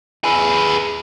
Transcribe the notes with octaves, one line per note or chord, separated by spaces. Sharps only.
G#4 B4